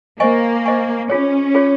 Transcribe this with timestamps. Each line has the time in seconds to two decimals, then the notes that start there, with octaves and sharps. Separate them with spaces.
0.20 A#3 C5 D#5 G#5 C#6
0.66 C5 D#5 G#5 C#6
1.10 C#4 F4 G#4 C#5
1.55 F4 G#4 C#5